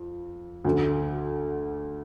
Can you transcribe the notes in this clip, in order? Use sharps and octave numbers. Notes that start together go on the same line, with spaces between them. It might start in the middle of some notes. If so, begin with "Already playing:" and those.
Already playing: F2
D2 D3